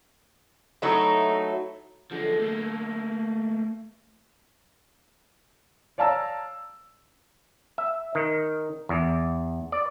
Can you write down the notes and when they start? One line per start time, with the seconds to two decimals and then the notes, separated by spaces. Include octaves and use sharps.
0.82 F#3 A3 D#4 E4
2.11 D3 F3 F#3 G#3
2.40 A3 A#3
5.98 C#5 D5 F5 A5 A#5 E6
7.78 E5
8.15 D#3
8.89 E2
9.72 D5